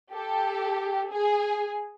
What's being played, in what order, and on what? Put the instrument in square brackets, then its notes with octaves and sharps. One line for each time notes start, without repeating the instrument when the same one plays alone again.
[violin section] G4 A4
G#4